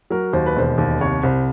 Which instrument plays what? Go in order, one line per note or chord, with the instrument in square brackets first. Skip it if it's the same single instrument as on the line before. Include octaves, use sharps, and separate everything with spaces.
[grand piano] F#3 A#4
D#2 C5
B4
E1 C5
D#2
C2 C#5
C2 C5